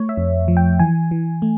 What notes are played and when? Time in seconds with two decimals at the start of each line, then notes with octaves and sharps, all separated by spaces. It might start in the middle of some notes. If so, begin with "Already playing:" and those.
Already playing: A3 C#5
0.09 E5
0.17 F2
0.48 F3
0.57 G5
0.79 E3 G#5
1.11 E3
1.42 A3